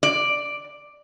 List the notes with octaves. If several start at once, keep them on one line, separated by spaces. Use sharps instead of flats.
D5